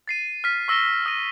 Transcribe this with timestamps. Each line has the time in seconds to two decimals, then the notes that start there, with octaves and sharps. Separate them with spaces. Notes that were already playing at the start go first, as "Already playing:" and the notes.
0.08 A6 C7 D#7
0.44 F6 B6 D#7
0.68 C#6 E6 A#6 E7 G7
1.06 D#6 F6 A#6 D#7